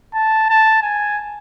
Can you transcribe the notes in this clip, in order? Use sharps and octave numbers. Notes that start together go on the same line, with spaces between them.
A5
A5
G#5